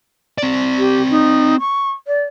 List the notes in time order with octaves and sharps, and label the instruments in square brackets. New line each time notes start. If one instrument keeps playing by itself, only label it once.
[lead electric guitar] C4 D5
[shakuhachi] G4
D#4
C#6
D5